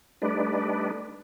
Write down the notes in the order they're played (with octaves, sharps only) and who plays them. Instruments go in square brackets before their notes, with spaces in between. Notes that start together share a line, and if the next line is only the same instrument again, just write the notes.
[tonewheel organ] G3 A3 D4 D#4 B4 D5